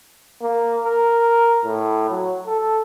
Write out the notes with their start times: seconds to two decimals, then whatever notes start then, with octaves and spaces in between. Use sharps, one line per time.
0.42 A#3
0.84 A#4
1.65 A2
2.10 F#3
2.47 A4